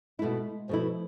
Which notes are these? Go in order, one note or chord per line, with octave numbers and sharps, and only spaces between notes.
B2 G#3 A3 E4
B2 F3 A3 E4